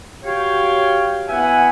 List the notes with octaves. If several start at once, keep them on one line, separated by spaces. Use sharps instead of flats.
F#4 G4 C#5 F5 G5
B3 E4 E5 F#5 G#5